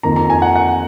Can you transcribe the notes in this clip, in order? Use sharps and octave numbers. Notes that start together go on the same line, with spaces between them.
F2 D#3 A#3 A#5
A#5
G#5
F#5
F#5